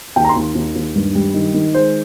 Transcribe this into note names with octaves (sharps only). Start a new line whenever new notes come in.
D#2 G5
A#5
C6
D#2
D#2
D#2
G2
G3
D#3
D#3
G#3 C5